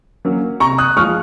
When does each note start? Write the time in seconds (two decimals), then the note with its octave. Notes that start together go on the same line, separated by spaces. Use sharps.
0.25 F#3 A#3 C#4
0.60 C3 A#5 C#6
0.78 D#6 F#6
0.97 F3 G#3 C#6 F6